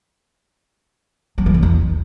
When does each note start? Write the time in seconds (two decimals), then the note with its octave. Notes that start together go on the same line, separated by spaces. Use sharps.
1.38 F#3
1.46 E3
1.54 C#3
1.63 E2